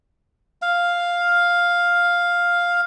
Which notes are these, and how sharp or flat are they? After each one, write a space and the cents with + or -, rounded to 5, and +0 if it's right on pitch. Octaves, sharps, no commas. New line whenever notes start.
F5 +5